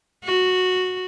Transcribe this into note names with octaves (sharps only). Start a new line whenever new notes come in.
F#4